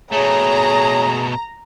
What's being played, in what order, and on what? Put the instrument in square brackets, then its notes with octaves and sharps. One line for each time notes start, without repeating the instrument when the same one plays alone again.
[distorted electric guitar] B2 A3 [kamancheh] G#4 [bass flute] C#5 [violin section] A#5